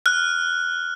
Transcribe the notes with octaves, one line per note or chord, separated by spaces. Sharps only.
F6 F#6